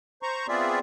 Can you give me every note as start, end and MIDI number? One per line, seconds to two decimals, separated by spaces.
0.23 0.47 72
0.23 0.47 82
0.23 0.47 85
0.48 0.79 59
0.48 0.79 60
0.48 0.79 65
0.48 0.79 68
0.48 0.79 74
0.48 0.79 76